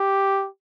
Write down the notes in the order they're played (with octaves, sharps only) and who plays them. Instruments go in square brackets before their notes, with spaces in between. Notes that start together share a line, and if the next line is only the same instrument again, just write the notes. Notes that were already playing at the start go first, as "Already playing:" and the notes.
Already playing: [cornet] G4